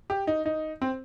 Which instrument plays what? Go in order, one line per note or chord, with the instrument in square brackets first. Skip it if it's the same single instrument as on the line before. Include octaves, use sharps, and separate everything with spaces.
[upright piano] G4
D#4
D#4
C4